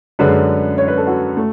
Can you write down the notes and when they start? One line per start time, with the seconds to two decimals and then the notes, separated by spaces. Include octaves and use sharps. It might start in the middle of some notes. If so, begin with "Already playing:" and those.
0.19 F#2 D3 G#3 B4
0.78 C#5
0.88 B4
0.98 A4
1.07 F#4
1.37 A3